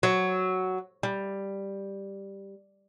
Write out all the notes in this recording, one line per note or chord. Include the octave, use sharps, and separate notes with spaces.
F#3
G3